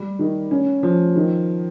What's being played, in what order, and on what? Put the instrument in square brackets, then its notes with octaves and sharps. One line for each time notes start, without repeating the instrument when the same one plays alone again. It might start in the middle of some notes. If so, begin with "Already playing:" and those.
Already playing: [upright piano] G3
D#3
C#4
F3
D#3